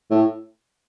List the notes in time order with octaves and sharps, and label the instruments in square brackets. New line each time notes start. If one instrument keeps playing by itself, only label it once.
[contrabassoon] A2